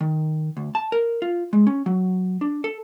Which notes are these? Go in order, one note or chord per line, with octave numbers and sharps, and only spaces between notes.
D#3
D2
A5
A#4
F4
G#3
C#4
F#3
D4
A4